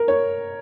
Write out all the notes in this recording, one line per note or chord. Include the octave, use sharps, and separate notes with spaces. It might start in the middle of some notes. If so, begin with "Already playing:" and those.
Already playing: A#4
C#5